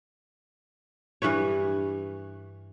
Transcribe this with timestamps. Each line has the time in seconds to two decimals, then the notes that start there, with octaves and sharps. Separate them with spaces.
1.22 G2 E3 B4 C#5